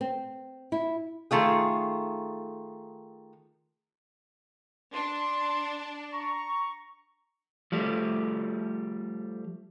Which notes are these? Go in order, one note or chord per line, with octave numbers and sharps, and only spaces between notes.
C4
E4
D#3 A3 F4 G#4
D4 C6
A#5 C#6
F3 G3 A3